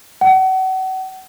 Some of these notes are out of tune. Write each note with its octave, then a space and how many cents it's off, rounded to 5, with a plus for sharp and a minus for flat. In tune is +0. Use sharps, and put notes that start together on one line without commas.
F#5 +35